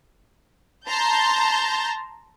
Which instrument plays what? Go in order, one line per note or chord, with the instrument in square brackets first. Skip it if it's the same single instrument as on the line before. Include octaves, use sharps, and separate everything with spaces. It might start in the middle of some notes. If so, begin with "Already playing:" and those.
[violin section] A5 A#5 C6 G6 A6